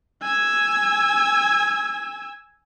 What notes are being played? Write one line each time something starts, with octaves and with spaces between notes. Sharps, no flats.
G#5 E6